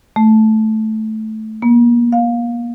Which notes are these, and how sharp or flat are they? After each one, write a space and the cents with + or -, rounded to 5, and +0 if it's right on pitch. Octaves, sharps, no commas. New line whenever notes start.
A3 -10
A#3 +35
F5 +15